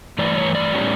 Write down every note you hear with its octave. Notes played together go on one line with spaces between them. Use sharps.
G2 E3 A3 D5
C#5
D5
A2 G3 C#4